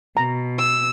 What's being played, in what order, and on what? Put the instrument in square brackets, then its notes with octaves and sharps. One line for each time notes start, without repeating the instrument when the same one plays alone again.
[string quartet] B2 [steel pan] A#5
[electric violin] E6